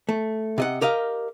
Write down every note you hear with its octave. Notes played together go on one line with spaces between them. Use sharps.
A3
C3 D#5 F#5
G4 A#4 D#5 F5